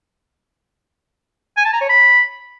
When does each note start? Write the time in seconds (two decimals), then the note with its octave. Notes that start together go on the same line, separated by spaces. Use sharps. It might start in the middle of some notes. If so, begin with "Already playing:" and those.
1.57 G#5
1.65 A5
1.73 A#5
1.81 C#5
1.89 B5